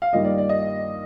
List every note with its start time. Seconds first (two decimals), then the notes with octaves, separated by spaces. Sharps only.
0.02 F5
0.12 G2 D#3 G3 A#3 F4 D#5
0.25 D5
0.38 D5
0.49 D#5